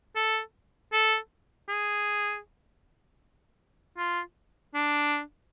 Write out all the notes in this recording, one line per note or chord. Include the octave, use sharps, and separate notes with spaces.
A4
A4
G#4
F4
D4